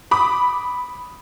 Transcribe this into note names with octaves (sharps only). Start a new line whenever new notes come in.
B5 D6 D#6